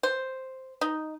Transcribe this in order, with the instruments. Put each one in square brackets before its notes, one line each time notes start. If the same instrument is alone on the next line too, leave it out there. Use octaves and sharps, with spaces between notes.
[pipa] C5
D#4